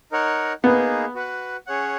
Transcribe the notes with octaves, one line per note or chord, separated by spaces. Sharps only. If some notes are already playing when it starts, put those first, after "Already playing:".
D#4 A#4 C#5 F#5
A#3 B3 D#4 G#4
F#4 B4 F#5
C#4 G#4 C#5 F#5